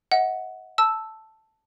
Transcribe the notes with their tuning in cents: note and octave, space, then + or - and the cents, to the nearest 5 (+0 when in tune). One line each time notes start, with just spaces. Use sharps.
D#5 +40 F#5 +0
A5 +0 E6 +0